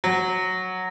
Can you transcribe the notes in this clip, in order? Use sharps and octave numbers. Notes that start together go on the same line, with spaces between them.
F#3